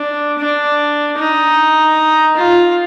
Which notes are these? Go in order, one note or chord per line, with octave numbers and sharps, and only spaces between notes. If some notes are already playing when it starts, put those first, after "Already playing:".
Already playing: D4
D4
D#4
F4